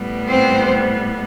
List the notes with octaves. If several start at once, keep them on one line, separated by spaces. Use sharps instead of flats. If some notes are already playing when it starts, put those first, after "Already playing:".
Already playing: A2 G3 B3
C4 C5